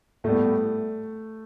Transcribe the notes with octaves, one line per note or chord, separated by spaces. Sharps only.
A2 G3 A3 B3